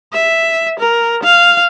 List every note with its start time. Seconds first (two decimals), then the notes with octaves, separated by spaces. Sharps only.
0.13 E5
0.80 A#4
1.23 F5